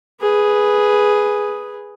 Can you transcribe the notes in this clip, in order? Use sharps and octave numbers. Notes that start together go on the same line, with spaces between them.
G#4 B4